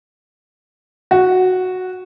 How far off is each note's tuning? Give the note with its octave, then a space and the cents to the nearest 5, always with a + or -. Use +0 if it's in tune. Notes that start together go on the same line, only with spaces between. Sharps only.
F#4 -5